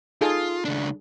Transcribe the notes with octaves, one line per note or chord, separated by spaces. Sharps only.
D#4 F4 G#4 A4
C#2 D4